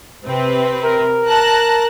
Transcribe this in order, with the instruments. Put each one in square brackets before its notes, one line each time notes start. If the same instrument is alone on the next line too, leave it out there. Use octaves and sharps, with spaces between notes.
[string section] C3 C4 B4
[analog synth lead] A#4
[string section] A5 F#6 A#6